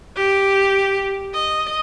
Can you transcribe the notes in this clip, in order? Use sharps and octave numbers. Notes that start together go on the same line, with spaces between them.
G4
D#5